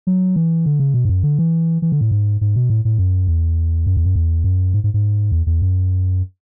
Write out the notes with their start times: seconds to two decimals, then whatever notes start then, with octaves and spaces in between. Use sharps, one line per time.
0.07 F#3
0.36 E3
0.66 D3
0.80 C#3
0.94 B2
1.05 G#2
1.09 F#2
1.23 D3
1.39 E3
1.82 E3
1.92 D3
2.01 A2
2.11 G#2
2.41 G#2
2.56 B2
2.70 A2
2.85 A2
2.98 F#2
3.27 E2
3.87 F#2
3.97 E2
4.05 F#2
4.16 E2
4.44 F#2
4.74 G#2
4.84 G#2
4.94 G#2
5.32 E2
5.47 E2
5.62 F#2